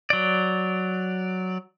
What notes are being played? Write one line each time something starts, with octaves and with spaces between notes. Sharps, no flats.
F#3 D5